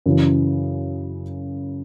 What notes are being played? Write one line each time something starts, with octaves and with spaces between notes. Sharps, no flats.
F#2 C#3 E3